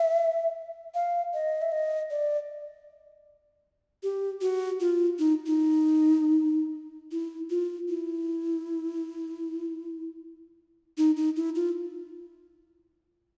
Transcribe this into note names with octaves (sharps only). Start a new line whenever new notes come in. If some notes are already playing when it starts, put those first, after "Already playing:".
Already playing: E5
F5
D#5
E5
D#5
D5
G4
F#4
F4
D#4
D#4
E4
F4
E4
D#4
D#4
E4
F4